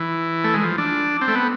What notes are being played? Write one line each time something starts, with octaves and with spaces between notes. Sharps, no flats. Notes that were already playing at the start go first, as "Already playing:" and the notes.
Already playing: E3
A3
G#3
F3
D4
C4
A3
B3